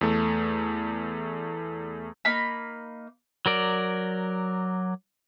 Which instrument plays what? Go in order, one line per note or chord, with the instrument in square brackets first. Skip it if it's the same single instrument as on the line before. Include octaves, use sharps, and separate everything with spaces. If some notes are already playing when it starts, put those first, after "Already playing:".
[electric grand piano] E2 A3
[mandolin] A#3 D#4 B5
[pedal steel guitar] F#3 A#4 D5